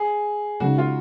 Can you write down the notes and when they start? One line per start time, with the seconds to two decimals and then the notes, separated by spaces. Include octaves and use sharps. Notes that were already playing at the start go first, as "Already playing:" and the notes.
Already playing: G#4
0.60 C#3 G#3 D#4 F#4
0.78 F4